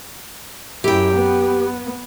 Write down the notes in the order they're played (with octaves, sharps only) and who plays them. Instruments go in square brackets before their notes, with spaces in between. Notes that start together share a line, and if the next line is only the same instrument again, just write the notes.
[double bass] F#2 E4 [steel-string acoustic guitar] G4 G5
[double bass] B3